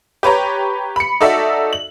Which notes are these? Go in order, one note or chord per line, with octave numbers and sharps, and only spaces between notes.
G4 B4 C#5 A#5
B5 C#7
D#4 F#4 A4 D5 E5
F#7